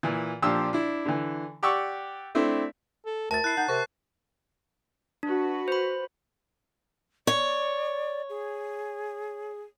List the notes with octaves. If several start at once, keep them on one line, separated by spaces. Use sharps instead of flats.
A#2 E3
A#2 F3 D4 G4 E6
D4 E4
D3 E3
G4 D5 F#5 C#6 E6
A3 C4 D4 E4
A4
D2 A#4 A5 A6
E4 F#6 C7
D#4 F#5 G6
C3 A#4 C5 C#6
D4 F#4 B4
C5 B5
C#5 D5
G#4